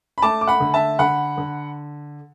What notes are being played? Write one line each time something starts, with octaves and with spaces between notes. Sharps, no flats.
B5
A3 A5 D6
D6
F#5 B5
D3
E5 A5
D3 F#5 B5
D3